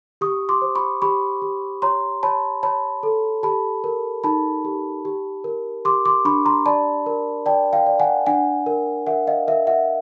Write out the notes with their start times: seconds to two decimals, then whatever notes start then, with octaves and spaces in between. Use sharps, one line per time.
0.21 G4 C#6 D#6
0.49 C6 D6
0.62 C5
0.75 B5 C#6
1.02 G4 B5 C#6
1.42 G4
1.82 C#5 A#5 C6
2.23 C#5 A5 B5
2.63 C#5 A5 B5
3.03 A4
3.43 G4 A5 B5
3.84 A#4
4.24 D#4 A5 B5
4.65 G4
5.05 G4
5.44 A#4
5.85 G4 C6 D6
6.05 C6 D6
6.25 D4 B5 C#6
6.45 A#5 C6
6.66 D5 A5 B5
7.06 A#4
7.46 D5 G5 A5
7.73 F5 G5
7.87 D5
8.00 F#5 G#5
8.26 D4 F#5 G#5
8.66 A#4
9.07 A#4 E5 F#5
9.27 D#5 F5
9.47 A#4 E5
9.67 E5 F#5